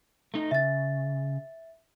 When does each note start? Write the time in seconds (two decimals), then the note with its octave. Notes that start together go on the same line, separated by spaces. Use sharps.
0.34 A3 D#4 D#5
0.51 C#3 E5 A6